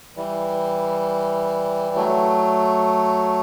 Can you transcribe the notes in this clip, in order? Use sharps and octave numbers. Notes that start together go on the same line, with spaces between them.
E3 G3
F#3 A3